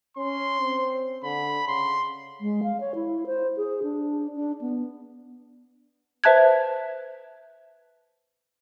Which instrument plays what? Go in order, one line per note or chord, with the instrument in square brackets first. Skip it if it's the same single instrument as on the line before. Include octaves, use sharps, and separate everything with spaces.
[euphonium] C#4 [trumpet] C6
[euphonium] C4
[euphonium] D3 [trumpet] B5
[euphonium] C#3 [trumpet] C6
[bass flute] G#3
F5
C#5
E4
C5
G#4
D4
D4
B3
[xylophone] B4 C5 E5 A5 F#6 G#6